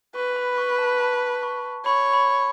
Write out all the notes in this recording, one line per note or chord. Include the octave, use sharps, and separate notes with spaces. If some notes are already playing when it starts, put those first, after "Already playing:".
B4 C#6
B5
C#6
A5
A5
C#6
C#5 B5
B5